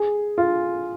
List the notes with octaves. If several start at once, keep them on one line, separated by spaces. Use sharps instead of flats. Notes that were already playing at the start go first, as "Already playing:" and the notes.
Already playing: G#4
F4